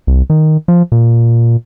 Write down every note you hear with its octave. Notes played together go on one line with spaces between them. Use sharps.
C2
D#3
F3
A#2